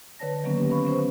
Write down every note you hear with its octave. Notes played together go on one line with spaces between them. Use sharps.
D3 B4 C#5 D5 A5 A#6
D#3 F#3 A#3 B3 C#4
C#4 G4 B4
B4 F5 B5 C#6
B3 C#4 C5